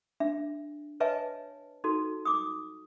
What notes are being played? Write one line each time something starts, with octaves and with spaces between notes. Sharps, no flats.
D4 E5
B4 C#5 D#5 E5 G#5 A5
D#4 F#4 A4
D6 D#6